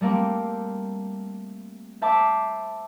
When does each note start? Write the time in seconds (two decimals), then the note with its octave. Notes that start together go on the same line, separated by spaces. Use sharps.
0.01 G3 A3 A#3 C4 G4
2.02 C5 E5 A5 B5 D6